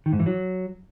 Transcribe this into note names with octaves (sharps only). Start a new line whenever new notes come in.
D#3
G#2
E3
F#3